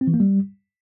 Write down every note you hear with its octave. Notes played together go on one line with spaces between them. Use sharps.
C4
E3
A#3
G3